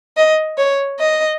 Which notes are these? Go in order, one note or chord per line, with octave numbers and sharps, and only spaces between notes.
D#5
C#5
D#5